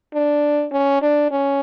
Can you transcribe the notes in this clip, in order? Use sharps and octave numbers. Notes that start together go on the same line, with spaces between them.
D4
C#4
D4
C#4